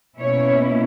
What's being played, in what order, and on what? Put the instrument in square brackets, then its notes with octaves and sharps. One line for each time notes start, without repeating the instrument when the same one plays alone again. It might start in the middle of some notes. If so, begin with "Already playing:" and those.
[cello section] B2 A#3 C#4 E4 C#5